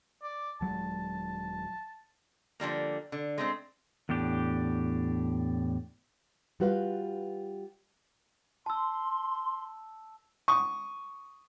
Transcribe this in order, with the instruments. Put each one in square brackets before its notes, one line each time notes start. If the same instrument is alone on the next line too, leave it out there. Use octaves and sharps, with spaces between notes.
[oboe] D5
[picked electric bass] D#1 F#3 G#3 [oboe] A5
[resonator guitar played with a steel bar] D3 F3 G3 A#3
D3
G#3 A3 C4
[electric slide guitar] E2 A2 D4 G4
[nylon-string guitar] G3 F4 F#4 B4 D#5 F5
[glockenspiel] A5 E6 [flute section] C6
[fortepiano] C#6 D#6